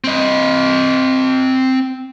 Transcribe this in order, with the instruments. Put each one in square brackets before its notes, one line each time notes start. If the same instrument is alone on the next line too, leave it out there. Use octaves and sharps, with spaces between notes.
[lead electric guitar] C4 D#5